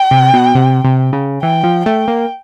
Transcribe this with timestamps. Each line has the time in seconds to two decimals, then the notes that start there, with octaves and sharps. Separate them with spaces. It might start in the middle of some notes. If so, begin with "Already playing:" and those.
Already playing: G5
0.11 C3
0.34 B2
0.55 C3
0.84 C3
1.13 C#3
1.42 E3 G5
1.64 F3
1.86 A3 G5
2.08 A#3